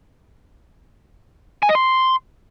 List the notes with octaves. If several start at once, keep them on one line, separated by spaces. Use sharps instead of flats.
G#5
D#5
C6